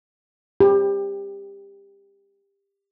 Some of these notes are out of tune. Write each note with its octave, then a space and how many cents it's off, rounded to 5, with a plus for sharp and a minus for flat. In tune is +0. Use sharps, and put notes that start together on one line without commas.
G4 +20